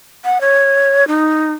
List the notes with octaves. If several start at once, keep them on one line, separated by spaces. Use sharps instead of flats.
F#5
C#5
D#4